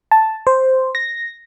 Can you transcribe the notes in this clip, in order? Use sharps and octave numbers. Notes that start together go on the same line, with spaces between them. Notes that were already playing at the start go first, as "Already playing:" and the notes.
A5
C5
A#6